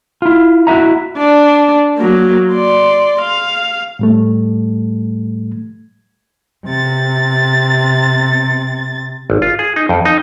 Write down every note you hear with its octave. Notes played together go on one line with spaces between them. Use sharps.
E4 F4
E4 F#4 G4 E5 A#5
D4
F#3 A#3
D5 C6
F5
A2 G3 A3
C3 A6
G#1
F4
G#4
D#4
F2
D#4